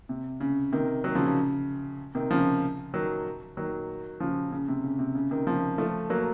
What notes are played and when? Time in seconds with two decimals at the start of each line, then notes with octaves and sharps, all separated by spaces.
0.09 C3
0.40 C#3
0.72 C3 D#3
1.04 D#3 F#3
1.15 C#3 F3
1.26 C#3
2.15 C3 D#3
2.31 C#3 F3
2.94 D#3 F#3
3.57 D#3 F#3
4.20 C#3 F3
4.52 C#3
4.68 C3
4.84 C#3
4.99 C3
5.15 C#3
5.31 C3 D#3
5.47 C#3 F3
5.78 F3 A3
6.10 F#3 A#3